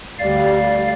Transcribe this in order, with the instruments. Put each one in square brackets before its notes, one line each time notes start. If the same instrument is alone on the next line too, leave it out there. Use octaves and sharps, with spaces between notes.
[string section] D2 G3 [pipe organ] D5 F5